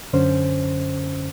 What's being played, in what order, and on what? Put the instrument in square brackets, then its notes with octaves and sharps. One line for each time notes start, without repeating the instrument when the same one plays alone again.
[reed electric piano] F#2 D3 C#4 C5